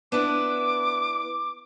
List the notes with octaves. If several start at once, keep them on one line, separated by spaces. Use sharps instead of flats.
B3 D4 E4 D6